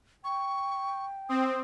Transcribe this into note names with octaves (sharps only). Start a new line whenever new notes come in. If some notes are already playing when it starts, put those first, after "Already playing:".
G5 C#6
C4 D#6